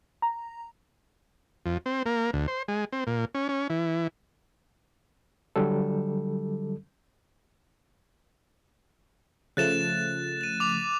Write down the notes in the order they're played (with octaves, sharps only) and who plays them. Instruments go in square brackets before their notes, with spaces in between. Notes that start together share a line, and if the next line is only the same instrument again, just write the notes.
[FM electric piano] A#5
[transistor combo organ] F2
C4
A#3
D2
C5
G#3
C4
A#2
C#4
C#4
E3
[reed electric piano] D3 F#3 G3 A4
[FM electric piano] C#3 F3 A3 [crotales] F#6 A6 E7
[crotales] A6 D#7
D6 F7